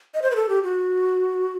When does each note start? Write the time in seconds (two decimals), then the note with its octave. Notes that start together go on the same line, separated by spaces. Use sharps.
0.14 D#5
0.22 C5
0.31 B4
0.36 A4
0.49 G4
0.63 F#4